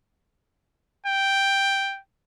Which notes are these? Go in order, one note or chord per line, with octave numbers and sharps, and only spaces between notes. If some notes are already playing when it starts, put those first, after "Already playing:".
G5